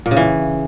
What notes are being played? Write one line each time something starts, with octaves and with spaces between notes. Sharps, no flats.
A#2
C#3
E3